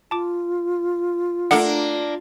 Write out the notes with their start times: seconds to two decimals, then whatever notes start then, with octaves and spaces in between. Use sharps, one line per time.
0.11 F4 A5 D6
1.51 A3 A#3 D4 A4 F#5